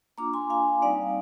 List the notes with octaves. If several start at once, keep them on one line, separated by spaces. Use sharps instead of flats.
A#3 D4 F4 A#5 D6
G#5 C6
F5 G#5
G3 C4 D#4 D5 F5